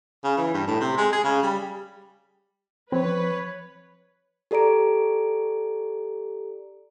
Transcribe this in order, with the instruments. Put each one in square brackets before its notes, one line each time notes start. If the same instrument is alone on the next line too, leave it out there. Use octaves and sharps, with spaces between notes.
[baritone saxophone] C#3
E3
G2
A2
C3
G#3
G#4
C#3
G3
[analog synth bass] F3 [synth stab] C4 [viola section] B4 [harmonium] C#5
[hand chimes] G4 A4 D5 A#5 D7